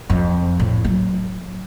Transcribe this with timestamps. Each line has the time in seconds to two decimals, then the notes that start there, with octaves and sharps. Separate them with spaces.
0.10 F2
0.60 A2
0.85 F#3